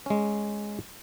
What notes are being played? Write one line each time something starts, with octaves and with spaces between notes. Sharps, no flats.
G#3 C#4